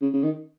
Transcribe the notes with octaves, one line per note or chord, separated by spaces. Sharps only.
C#3
C#3
D#3